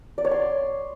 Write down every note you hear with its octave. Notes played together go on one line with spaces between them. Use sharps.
D5
C#5
C6